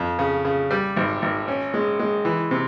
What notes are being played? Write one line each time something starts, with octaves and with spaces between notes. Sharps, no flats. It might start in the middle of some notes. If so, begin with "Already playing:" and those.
Already playing: F2
C#3
C#3
G3
G#1
G#1
C#4
G#3
G#3
E3
C3